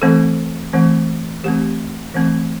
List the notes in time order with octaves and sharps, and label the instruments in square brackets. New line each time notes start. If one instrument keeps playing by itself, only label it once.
[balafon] E3 A3 C4 A4
E3 A3 C4
E3 A3 C4 G4
E3 A3 C4